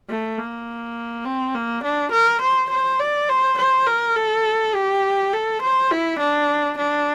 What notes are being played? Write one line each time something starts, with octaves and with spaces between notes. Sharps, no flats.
A3
A#3
C4
A#3
D4
A#4
C5
C5
D5
C5
C5
A#4
A4
G4
A4
C5
E4
D4
D4